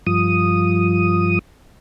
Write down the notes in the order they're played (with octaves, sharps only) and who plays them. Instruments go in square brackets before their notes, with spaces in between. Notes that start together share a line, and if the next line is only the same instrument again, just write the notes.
[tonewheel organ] G2 F3 D#6